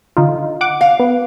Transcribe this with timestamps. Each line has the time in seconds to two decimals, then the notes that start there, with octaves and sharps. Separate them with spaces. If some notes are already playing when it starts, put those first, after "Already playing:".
0.17 D3 D#4 F4
0.61 F#5 D6
0.81 F5
1.00 B3